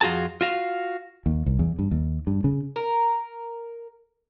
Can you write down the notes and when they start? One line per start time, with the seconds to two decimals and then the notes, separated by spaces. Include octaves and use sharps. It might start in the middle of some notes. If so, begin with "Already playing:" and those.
0.01 F2 F4 F#4 G#4 A5
0.41 F4 F#4 F5
1.26 D#2
1.46 C2
1.59 E2
1.79 G2
1.91 D#2
2.27 G2
2.44 C#3
2.76 A#4